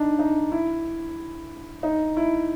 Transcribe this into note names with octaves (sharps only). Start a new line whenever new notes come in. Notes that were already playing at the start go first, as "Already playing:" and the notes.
Already playing: D4 D#4
D#4
E4
D#4
E4